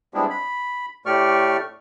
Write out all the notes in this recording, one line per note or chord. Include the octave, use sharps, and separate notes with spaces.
G3 G#3 B3 C4 D4 E4
B5
A2 A3 G4 D5 C#6 F6